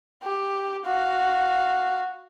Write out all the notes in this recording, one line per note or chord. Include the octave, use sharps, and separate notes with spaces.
G4
F#4 F5